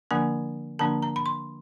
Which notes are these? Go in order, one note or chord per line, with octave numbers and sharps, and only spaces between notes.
D3 F3 A#3 D4 G#5
D3 F3 A#3 D4 A5
A#5
B5
C6